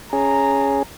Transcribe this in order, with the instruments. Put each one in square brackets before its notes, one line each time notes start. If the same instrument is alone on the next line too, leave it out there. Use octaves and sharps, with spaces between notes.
[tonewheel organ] C#4 G#4 [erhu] A#5